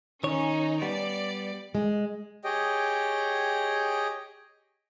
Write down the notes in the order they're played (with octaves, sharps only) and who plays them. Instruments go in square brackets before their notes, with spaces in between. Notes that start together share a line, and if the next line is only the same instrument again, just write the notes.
[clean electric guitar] D#3 C#5 [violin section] C#4 D#4
[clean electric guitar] G3 B3 [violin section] D5
[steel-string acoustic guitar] G#3
[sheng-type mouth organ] G4 G#4 C#5 D#5 G5